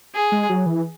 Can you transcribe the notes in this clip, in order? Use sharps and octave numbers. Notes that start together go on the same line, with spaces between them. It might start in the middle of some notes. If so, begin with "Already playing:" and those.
G#4
G#3
F#3
E3